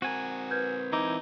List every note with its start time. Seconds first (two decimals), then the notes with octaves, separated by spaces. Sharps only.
0.02 C4 F#4 A#4 G#5
0.51 B4 G6 G#6
0.92 E3 D#4 E4 D6